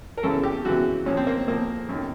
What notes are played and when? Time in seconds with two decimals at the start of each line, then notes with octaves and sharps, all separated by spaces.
0.17 A#4
0.23 F#2 C#3 E3 A4
0.43 G4
0.65 F#2 C#3 E3 F#4
1.06 A#2 F3 C#4
1.17 C4
1.27 A#3
1.48 A#2 F3 A#3
1.89 F#2 D#3